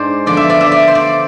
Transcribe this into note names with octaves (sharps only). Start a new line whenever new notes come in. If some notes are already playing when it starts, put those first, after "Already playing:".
Already playing: G#2 G#3 D4 C5 D5
D3 F3 B3 D5
E5
D5
E5
D5
C5
D5